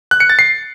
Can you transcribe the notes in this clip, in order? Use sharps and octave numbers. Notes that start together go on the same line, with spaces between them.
F#6
C#7
A6
C7